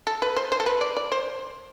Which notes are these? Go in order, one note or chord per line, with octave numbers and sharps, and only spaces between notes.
A4
B4
C5
C5
A4
B4
D5
D5
C5